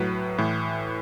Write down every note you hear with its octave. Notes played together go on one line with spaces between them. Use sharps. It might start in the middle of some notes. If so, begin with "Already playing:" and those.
Already playing: A2 F#3 B4
A2 E3